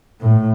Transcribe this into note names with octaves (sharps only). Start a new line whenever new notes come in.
A2